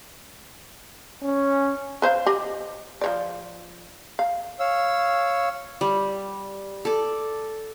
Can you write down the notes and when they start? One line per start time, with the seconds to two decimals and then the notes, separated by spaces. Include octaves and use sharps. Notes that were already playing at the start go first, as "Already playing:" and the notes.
1.23 C#4
2.02 B4 C5 F5
2.26 G4 D#5
3.01 F3 C#5 D5
4.19 F5
4.60 C#5 F5 E6
5.81 G3
6.85 A4 D5